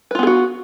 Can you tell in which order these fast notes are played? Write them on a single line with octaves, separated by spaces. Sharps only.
B4 F4 B3 G#4 F#4